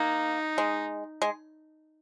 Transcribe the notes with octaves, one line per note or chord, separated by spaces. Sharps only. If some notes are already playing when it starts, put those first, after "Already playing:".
Already playing: A#3 D#4
G#3
G#3